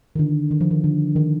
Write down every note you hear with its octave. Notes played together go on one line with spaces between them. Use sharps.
D#3
D3
D#3
F3
D#3
D3
D#3